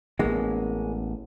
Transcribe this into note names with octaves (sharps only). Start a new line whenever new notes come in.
A1 G#3 A#3 B3 C#4